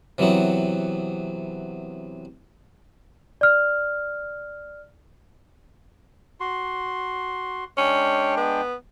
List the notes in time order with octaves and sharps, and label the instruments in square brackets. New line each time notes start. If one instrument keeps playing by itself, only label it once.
[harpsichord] C3 E3 F#3 B3 C4
[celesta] D5 F6
[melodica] F#4 C6
[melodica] G#3 D4 G5 [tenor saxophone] C#4
[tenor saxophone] B3